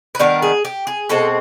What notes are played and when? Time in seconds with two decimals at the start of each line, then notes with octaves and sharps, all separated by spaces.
0.15 B4
0.19 D#3 G3 B3 D4 A#4
0.42 G#4
0.65 G4
0.87 G#4
1.09 B2 G#3 C4 A4